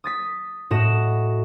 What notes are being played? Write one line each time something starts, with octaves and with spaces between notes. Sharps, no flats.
D#6 A6 B6
A2 F#4 D#5 E7